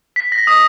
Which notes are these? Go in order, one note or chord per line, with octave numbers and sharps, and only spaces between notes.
B6
A#6
D#6